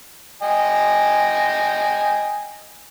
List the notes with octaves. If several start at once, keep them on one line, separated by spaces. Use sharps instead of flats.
D#5 G5 G#5